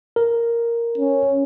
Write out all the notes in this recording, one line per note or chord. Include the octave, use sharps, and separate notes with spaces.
A#4
C#4